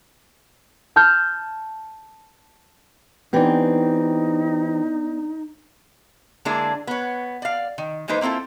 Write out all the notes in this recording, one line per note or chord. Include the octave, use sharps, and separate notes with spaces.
A5 F6 G6
E3 B3 C4 D4 D#4 G4 D5
D3 G#3 A#3 D4 E4 G#4
B3 C#5
D5 F5
D#3
E3 G#3 A#3 D#4 B4 C5
A#3 C4 E4 F4 A4